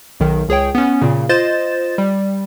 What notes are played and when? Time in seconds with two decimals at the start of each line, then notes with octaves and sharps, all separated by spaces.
0.20 B1 D#3
0.48 C#2 G#4 C#5 G5
0.75 B3 C#4
1.02 A#2 C#3
1.29 F4 C5 D#5 A6 E7
1.98 G3